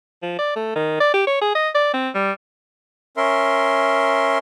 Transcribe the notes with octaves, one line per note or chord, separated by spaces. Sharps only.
F3
D5
A3
D#3
D5
G4
C#5
G#4
D#5
D5
C4
G3
C#4 A#4 E5 C6